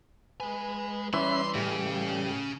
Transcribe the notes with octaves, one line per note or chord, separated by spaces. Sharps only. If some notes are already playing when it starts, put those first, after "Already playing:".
G#3 B4 G#5
E3 G3 C#4 E5 B5 C6
A2 C#3 G4